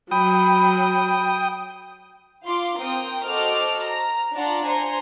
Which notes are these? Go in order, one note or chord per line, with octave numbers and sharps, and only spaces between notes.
F#3 G5 B5 D#6
F4 F5 C6 D6
C4 A#4 G5 D#6
F#4 A4 C5 D#5 D6 F6
A#5
D4 F4 D5 F#5 A5 A#5
C5 G#5 A#5 C6 C#7